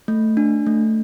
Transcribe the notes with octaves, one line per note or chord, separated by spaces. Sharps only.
A3
D4
A3